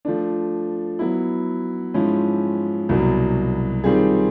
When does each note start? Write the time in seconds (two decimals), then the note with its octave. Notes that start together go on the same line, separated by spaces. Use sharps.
0.05 F3 A3 D4
0.99 F#3 B3 E4
1.94 G#2 F3 G#3 C#4 E4
2.89 C2 B2 F#3
3.84 D#3 G3 C4 F4 G#4